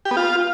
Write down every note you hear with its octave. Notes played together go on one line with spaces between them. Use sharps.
G4
B3
F4